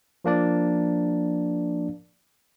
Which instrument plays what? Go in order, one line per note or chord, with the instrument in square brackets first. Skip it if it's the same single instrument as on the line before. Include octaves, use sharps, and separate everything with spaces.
[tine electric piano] F3 A#3 D4 D5